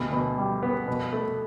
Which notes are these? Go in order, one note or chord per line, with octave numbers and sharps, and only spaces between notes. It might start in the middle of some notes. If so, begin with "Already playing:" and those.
Already playing: D2 B2
B2
G3
B3
B2
A3